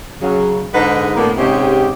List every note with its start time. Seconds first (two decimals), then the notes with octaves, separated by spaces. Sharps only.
0.21 C#3 F#3
0.73 G#2 D3 G#3 D#4 B4 F#5
1.16 D2 A2 D3 A#3 B3
1.37 G#2 C3 G#3 C#4 G4